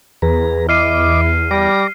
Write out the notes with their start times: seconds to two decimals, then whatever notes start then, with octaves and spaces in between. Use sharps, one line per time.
0.22 E2 G#4 B4 A#5
0.69 E4 D#5 D6 F6 C7 D#7
1.51 G3 D6 A#6